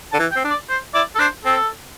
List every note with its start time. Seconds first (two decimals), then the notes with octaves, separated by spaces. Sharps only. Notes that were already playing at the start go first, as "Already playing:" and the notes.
0.12 D3 A5
0.19 E3
0.31 G5
0.36 C4
0.45 D4
0.50 D5
0.69 C5
0.94 E4 D5
1.15 A4
1.19 D4 C5
1.45 C4 A4